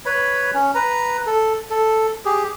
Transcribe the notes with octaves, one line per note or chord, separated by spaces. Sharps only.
B4 C#5 B5
C#4
B4 A#5
A4
A4
G4 G#4